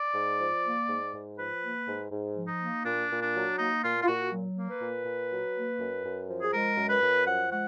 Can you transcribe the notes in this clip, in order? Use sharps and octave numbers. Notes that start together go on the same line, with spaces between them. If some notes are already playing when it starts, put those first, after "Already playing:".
Already playing: D5
G#2
F3
A#3
G#2
G#2
F3 B4
A#3
G#2
G#2
F3
D#4
A#3
A#2 D4
A#2
D4
F#3
A#3 D#4
A#2 F4
F4
A#2 F#4
F#3
A#3
B4
A#2
A#2
F#3
A#3
F#2
F#2
F3
G#4
G#3 A#4
F#2
B4
F#2
F3 F#5
G#3 F#5